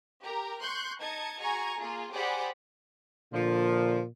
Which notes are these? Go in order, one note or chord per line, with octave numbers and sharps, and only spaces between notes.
G4 A#4 A#5
C6 C#6 F#6 G6
D#4 D#5 A5 G#6 C#7
F#4 G#4 G#5 A#5 C#6 G#6
A#3 F4 G#4
G4 G#4 C5 D5 F#5 B5
A#2 D3 F3